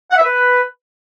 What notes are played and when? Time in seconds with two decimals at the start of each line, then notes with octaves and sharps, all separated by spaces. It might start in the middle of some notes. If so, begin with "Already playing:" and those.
0.11 F#5
0.18 E5
0.24 B4